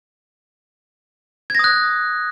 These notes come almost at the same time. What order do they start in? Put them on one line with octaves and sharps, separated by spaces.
G#6 A#6 D#6 F#6